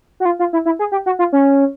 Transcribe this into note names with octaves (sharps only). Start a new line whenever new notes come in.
F#4
F4
F4
E4
E4
G#4
G4
F#4
F4
C#4